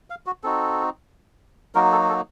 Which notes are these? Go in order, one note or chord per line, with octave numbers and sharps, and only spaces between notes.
F5
F#4
C4 D#4 F#4 A4
F#3 A#3 D#4 F#4 A#4
A4
A4